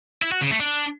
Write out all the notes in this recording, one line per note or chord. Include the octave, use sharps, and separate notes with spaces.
E4
F#4
C#3
A3
D4